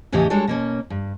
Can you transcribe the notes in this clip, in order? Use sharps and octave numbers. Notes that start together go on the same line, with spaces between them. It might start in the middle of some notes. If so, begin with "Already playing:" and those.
E2 A2 C#3 E3 G4 D#5
G3 G#3 D4 F#4 A4 C#5
B2 A#3 C#4
G2